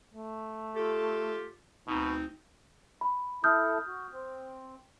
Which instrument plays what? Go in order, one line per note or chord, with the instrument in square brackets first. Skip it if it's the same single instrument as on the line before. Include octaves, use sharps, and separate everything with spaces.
[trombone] A3
[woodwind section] F4 G4 A4
[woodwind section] D2 C4 D#4 [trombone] B2
[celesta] B5
[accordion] E4 A4 [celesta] D#6 F6 G6
[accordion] F#4
C4